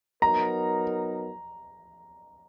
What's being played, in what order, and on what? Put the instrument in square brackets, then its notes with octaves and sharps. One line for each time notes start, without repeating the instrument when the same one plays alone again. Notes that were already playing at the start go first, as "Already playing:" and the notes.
[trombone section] F#3 B3 D#4 A#4 [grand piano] A#5